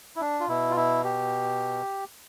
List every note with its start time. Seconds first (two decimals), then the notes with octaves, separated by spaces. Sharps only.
0.16 E4
0.21 D4
0.40 F4
0.48 B2 E4
0.71 F4
0.77 E4
1.04 G4